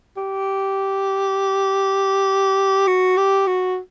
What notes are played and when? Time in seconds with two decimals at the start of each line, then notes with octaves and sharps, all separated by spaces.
0.17 G4
2.87 F#4
3.17 G4
3.47 F#4